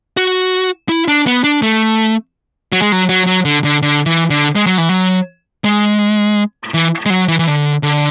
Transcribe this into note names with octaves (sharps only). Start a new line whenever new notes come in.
F#4
E4
D4
B3
D4
A3
F#3
G#3
F#3
F#3
F#3
D3
D3
D3
E3
D3
G#3
F#3
E3
F#3
G#3
E3
G#3
F#3
E3
E3
D3
D3